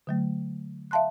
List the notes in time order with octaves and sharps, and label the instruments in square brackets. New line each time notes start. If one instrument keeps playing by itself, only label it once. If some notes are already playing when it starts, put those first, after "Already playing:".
[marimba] D3 F#3 A3
E5 F5 A5 C6 F#6